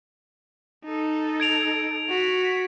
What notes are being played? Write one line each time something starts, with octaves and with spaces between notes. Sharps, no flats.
D#4 A4
G#6 D7 F7
F#4 B6